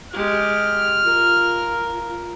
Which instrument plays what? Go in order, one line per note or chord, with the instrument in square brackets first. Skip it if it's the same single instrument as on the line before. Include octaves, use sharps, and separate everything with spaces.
[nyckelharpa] G#3 G4 [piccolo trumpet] F6
[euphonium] F4 [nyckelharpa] A#4